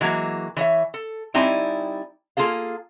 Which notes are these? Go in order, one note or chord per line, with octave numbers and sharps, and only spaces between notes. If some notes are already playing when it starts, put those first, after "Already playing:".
E3 F#3 G#3 A#3 F#4
E3 C#5 E5
A4
G3 C4 D#4 E4 D5 G#5
A#3 F4 G#4 A4 F5